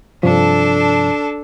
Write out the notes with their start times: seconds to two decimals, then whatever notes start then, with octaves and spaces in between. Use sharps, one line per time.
0.23 G2 C3 F3 D4 A4